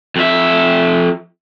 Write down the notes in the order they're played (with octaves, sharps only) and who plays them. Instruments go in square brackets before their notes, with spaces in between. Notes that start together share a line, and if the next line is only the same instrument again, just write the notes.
[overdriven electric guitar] F2 E5